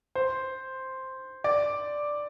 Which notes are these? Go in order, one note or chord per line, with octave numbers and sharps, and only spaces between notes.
C5
D5